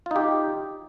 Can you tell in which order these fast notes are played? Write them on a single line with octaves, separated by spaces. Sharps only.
F4 D#4 G4